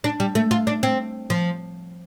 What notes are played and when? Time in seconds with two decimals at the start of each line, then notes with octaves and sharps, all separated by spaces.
0.04 D4
0.20 G3
0.35 A3
0.51 F4
0.67 D4
0.83 C4
1.30 F3